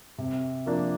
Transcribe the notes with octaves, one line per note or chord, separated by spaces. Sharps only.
C3
F3 A#3 D4